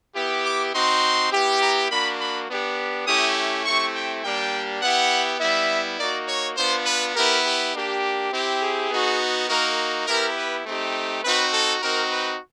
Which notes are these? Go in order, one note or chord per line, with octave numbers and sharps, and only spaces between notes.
B3 E4 G4
D6
C4 D#4 F#4 C6
B3 E4 G4
A#5
A#3 D4 F#4 B5
B5
B3 D4 G4
A3 C#4 E4 G4 D#6
A3 C4 E4 G4 C#6
G5
G3 A#3 D4 G4 G5
B3 E4 G4 F#5
G3 B3 E4 E5
A#3 D#4 F#4 D5
C#5
B3 D4 F4 C5
B4
B3 E4 G4 A#4
G4
A#3 D4 G4
C4 E4 G4
G#4
B3 D#4 F#4
A#3 D#4 F#4 A#4
B3 E4 G4 A#4
B4
A3 C4 D#4 G4
C4 D#4 F#4 B4
A4
C4 D#4 F#4 A#4
B4